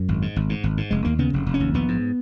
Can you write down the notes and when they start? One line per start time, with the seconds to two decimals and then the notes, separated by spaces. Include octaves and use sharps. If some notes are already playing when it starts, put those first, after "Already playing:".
Already playing: F#2
0.08 G#1
0.22 G#2
0.36 G#1
0.49 G#2
0.64 G#1
0.77 G#2
0.91 F1 G#3
1.05 D#2 A#3
1.19 C#3 B3
1.33 F1
1.46 F1
1.54 C#4
1.60 D#2
1.74 A#1 B3
1.88 G#2